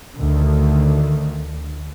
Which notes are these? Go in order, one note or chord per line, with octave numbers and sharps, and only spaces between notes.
D2 D3 D#3